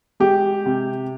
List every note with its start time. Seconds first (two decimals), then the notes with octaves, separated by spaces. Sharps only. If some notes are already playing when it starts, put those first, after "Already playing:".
0.20 G#3 G4
0.66 C3